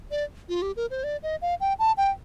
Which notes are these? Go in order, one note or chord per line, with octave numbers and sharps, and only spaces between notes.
D5
F4
G4
A#4
C5
D5
D#5
F5
G5
A5
G5